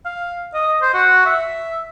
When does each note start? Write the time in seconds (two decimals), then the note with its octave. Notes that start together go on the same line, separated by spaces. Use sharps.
0.05 F5
0.54 D#5
0.82 C5
0.94 F#4
1.26 E5